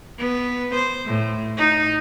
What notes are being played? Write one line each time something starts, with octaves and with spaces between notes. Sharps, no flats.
B3
C5
A2
D#4